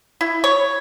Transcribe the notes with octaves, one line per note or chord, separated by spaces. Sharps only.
E4
C#5